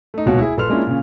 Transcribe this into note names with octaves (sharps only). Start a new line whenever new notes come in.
A3 D#4
D#1 C#2 B2 F#4 C#5
E4 G#4
A#1 A4 B4 C6 F6 F7
G#3 A#3 C#4 D4 E4 F4
A#2 C#3 C#4